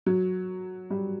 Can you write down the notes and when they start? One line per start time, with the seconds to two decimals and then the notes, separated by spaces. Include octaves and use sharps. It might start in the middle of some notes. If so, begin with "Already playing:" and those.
0.06 F#3
0.90 G3